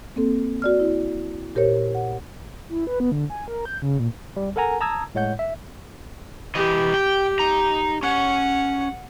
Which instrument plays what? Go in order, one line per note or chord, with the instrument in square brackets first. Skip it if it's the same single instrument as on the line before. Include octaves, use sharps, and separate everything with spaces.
[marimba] A#3 C4 A4
F#4 D5 F6
E4
A#2 G4 A#4 C5 C#5
F#5
[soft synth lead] E4
B4
B3
D3
G#5
A#4
G6
C#3
A#2
[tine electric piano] G3
A4 A#4 F#5 G#5 A#5
A5 A#5 D#6 E6 G#6
A2 G#3 C#5 F#5 G6
E5
[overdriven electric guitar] E3 D#5 [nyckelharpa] G4
[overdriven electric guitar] G5
D#4 A#5
[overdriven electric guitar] C#4 [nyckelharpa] F#5